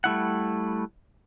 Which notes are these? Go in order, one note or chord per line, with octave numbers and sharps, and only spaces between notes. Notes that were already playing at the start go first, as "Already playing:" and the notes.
G3 A3 E4 F#5